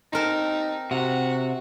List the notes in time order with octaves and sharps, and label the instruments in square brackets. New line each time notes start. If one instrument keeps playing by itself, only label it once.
[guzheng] C4 A#4 A5 [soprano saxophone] D#4
[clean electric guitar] C3 [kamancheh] F#4 [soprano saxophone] F#5